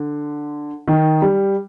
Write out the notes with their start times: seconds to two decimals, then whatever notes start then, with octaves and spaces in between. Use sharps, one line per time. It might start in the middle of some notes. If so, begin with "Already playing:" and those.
Already playing: D3
0.88 D#3
1.22 G3